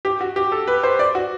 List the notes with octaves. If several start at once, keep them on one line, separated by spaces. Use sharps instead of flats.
G4
F#4
G4
A4
B4
C5
D5
F#4